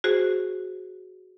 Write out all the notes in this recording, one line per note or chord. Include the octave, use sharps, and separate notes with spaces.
F#4 G#4 C5